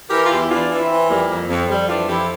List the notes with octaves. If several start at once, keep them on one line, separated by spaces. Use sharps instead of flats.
E3 G4 A#4
F4
E2 E4 G4
E3 D4 F4
E3
C4 E4
E3
F2 G3 A#3
F2
F2
F2 G3
E3 D4 F4
F2 E4 G4